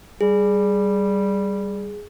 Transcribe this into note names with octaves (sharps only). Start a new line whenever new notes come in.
G3 G#4